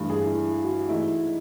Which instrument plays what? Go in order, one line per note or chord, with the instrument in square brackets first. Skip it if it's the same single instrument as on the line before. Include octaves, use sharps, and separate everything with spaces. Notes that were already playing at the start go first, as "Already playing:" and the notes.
Already playing: [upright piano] G2 E3 A3
G#4
E4
F#4
G#2 E3 A3 E4